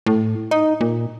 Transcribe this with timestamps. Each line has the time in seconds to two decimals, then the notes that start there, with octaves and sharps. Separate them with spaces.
0.06 A2
0.51 D#4
0.81 A#2